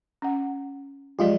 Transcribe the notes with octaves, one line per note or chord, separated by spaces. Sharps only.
C#4 F#5
F3 F#3 G#3 F4 G4 D5